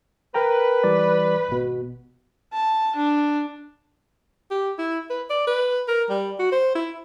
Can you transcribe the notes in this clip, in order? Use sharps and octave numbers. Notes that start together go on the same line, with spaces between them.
A#4 B4 G5 A#5
E3 G3 D5
G#1 B2
A5
D4
G4
E4
B4
D5
B4
A#4
G3
F#4
C5
E4